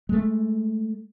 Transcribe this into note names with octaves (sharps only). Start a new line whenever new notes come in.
G#3 A3